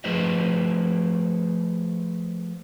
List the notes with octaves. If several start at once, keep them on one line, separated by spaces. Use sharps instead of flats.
F3 A3 G#4 B4 C5 D#5